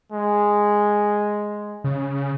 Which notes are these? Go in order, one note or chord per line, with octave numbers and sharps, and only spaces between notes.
G#3
C#3